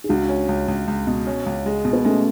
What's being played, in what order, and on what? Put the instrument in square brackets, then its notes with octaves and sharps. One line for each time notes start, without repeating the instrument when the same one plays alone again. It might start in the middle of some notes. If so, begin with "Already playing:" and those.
[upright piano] G#4
[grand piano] C#2 [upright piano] D4 F#4
[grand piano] C#4
C#2
C#2
C#2
B2
C#4
C#2
G#3
B2
[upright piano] B3
[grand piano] G#3 [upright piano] A3 C#4